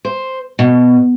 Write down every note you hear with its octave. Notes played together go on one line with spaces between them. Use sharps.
C5
B2